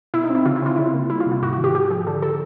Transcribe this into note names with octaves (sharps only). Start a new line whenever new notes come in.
B2 E4
D#4
C4
E4
C#3 F4
E4
C4 F4
C#3 E4
A#3
G3 E4
F4
C3
F4
G#2 F#4
F#4
D#3
G4
G#2 G4
F3 G#4
D3 A4
A4